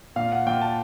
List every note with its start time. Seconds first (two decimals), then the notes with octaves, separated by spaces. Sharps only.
0.16 A#2 F5
0.32 F#5
0.46 A#2 G5
0.61 A5